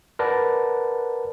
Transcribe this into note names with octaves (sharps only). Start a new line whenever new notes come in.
A#4 B4 D5 F#5 A5 A#5